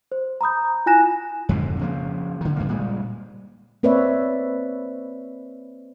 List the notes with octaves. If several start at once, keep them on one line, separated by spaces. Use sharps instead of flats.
C5
A#5 B5 D#6 G6
E4 F4 G#5 F#6 A#6 E7
F2 G#2 B2 D3
C#3 F3 A#3
D3 D#3
G2 D3 A#3
A#2 G3 G#3
A#3 C4 B4 C#5 D5 E5